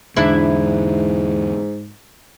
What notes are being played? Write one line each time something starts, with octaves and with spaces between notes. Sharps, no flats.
E2 G#2 D3 D4 E4